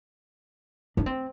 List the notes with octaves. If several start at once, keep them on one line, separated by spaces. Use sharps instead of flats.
D4
C4